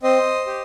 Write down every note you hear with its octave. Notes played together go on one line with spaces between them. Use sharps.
C4 C5 D#5
G4